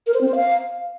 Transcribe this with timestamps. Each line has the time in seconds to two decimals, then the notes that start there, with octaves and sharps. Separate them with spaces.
0.07 A#4
0.14 C5
0.21 C4
0.28 C5
0.35 F5